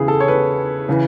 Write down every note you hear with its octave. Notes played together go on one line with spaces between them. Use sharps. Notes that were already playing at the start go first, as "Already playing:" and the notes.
Already playing: E2 C#3 E3 E4 G#4
A4
C#5
B4
C#3 E3